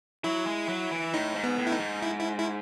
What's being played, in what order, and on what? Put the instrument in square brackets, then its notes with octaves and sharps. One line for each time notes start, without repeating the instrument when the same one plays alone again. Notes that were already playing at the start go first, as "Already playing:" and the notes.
[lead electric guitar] F#3 [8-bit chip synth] E4
[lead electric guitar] G#3
F#3
E3
[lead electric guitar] A2 [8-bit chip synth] D#4
[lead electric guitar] G#2
[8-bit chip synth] B3
[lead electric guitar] A2
[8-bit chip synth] E4
D#4
[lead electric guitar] G#2
[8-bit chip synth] E4
E4
E4